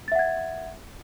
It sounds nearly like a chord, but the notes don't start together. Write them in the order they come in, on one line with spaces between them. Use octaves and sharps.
A6 E5 F#5 G#6